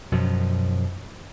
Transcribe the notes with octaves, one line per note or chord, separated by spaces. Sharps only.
F#2 B2 F3